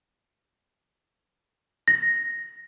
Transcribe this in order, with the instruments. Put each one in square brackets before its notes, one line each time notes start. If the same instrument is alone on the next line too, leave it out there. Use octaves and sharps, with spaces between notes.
[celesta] A#6